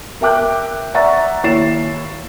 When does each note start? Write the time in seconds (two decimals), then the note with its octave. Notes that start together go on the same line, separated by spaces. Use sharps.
0.21 A#4 E5 G5 D6 F#6 G6
0.94 D5 E5 F#5 A#5 C#6 A6
1.43 D#2 E4 C#5 A6 C7 E7